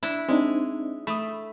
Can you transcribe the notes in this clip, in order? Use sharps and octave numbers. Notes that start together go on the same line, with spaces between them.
D4 E4
G#3 C4 D4 D#4
A3 B5 D#6